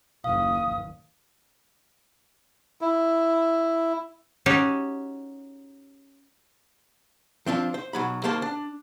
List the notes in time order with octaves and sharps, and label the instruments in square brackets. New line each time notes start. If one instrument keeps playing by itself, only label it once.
[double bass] F#1 D#2 [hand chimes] F5 [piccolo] D#6
[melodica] E4
[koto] C#4 D#4 F#4 G4
[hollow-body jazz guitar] F3 C4 D4 F4
C5
B1 F#3 B5
D#2 A#3 C5 A5 C6
D4